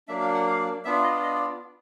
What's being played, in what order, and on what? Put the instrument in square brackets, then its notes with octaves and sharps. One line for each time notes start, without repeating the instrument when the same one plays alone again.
[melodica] F#3 A#3 D4 E5
F5
F#5
F5
B3 D4 F4 E5
D#5
D#5
D5